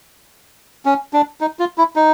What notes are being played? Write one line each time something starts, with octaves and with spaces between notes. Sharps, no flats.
C#4
D4
D#4
F4
E4
D#4